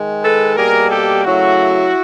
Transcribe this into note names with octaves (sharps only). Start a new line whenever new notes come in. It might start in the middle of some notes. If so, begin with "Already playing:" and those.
Already playing: D#3 G#3
A4 B4
B2 G3 A#3 G#4 A#4
G4 A4
C#3 F#3 A3 E4 F#4